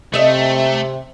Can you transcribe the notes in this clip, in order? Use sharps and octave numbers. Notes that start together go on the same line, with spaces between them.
C3 A3 D#5 E5